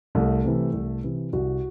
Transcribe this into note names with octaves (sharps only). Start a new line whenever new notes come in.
C2 A3
C3 E3
C2
C3 E3
C2 F#4